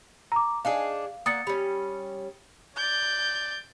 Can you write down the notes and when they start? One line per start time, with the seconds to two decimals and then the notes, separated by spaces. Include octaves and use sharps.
0.32 A#5 D6
0.65 D4 D#4 G#4 F5
1.26 A#3 D5 F#5 D#6 A6 C#7
1.47 G3 C#4
2.76 D5 G6